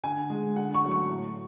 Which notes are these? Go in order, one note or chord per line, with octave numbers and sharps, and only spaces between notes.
D3 G#5
G#3
D3 F#5
C#6
F#3 A3
C#6
A2